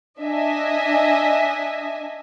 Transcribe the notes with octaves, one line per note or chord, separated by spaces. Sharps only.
D4 D#5 E5 G#5